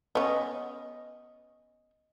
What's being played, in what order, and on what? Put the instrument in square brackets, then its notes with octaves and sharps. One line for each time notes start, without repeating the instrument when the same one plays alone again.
[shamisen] B3 C#4 [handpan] D#5